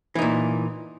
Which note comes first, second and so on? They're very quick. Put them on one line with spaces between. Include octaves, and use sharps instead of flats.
E3 D#4 A#2